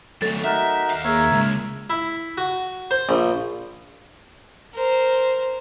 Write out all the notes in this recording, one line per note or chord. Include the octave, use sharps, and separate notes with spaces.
F#3 A3 A4
D#4 F#4 A#4 E5
D#2 F5
A#3 G#4 A#4 C#5 E5
C#3 G#3
E4
F#4
C5
A#1
A#4 C5